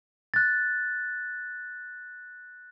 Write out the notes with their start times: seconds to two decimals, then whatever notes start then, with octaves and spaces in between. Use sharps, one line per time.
0.34 F#6 A6